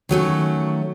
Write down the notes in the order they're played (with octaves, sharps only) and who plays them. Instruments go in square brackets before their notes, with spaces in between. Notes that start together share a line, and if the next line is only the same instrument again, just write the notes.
[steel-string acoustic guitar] D#3 F#3 A3 C#4